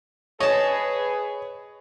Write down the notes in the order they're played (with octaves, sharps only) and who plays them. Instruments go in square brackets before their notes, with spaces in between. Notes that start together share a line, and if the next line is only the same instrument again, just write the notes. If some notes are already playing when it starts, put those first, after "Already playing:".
[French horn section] G#4 B4 [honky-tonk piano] C#5 [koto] D#5 A5